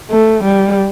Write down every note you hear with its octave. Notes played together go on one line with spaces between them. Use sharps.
A3
G3